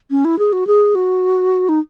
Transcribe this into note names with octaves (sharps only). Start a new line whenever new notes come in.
C#4
E4
G#4
F#4
G#4
F#4
D#4